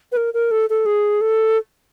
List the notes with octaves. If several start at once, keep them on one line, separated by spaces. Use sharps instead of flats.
B4
A#4
A#4
A4
A4
G#4
A4